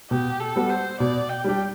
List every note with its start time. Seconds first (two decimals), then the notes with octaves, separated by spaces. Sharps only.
0.11 B2 G4
0.40 A4
0.56 G3 B3 F#4
0.70 C5
1.00 B2 D5
1.29 G5
1.44 G3 D4 G4